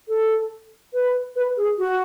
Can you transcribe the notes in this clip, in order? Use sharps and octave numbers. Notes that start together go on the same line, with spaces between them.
A4
B4
B4
G#4
F#4